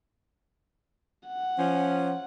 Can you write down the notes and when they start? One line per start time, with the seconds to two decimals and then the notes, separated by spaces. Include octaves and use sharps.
1.27 F#5
1.58 F3 C#4